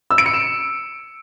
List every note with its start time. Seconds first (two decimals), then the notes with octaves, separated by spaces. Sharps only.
0.11 E6
0.18 D7
0.26 C#7
0.33 E7